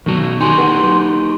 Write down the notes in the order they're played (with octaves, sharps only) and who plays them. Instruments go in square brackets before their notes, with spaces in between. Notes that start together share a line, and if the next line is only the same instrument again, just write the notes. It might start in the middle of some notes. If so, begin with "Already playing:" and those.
[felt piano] B1 [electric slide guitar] D#3 F#4
[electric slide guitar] D#4 F#4 G4 [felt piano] G#5 [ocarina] C6
[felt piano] B4 F#5
F#3